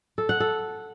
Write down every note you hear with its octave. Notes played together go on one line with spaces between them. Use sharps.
A4
F#5
A4